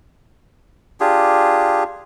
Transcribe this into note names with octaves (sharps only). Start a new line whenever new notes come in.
D4 F4 G4 G#4